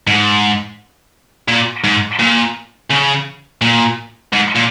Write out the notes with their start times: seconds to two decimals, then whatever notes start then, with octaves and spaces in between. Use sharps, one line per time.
0.07 G#2
1.48 A#2
1.84 G#2
2.19 A#2
2.90 C#3
3.62 A#2
4.33 G#2
4.55 A#2